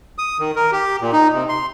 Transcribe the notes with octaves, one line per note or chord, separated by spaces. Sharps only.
D#6
D#3
A#4
G4
A#2
D#4
C3
C6